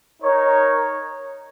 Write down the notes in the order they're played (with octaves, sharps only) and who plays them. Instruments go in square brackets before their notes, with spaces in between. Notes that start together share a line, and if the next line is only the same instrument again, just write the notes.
[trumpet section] D#4 A#4 C#5